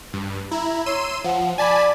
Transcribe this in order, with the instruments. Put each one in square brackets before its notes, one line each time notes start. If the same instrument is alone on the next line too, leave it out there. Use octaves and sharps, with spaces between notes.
[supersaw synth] G2
[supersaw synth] E4 [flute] A#5
[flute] C#5 [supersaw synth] C6 E6 D#7
[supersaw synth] F3 [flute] F#5
[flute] D5 [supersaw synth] G#5 A5 B5